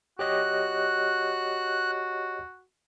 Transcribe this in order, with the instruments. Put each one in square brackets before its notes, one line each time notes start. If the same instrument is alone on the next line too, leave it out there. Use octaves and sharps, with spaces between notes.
[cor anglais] F#4 [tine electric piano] G4 C#5 D#5 [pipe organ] F#6